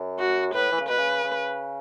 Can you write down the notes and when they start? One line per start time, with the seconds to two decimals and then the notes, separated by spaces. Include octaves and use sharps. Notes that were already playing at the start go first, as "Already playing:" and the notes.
Already playing: F#2
0.20 F#4
0.54 A2 B4
0.72 E3
0.81 C#3
0.89 B2 B4
0.98 C#3
1.24 C#3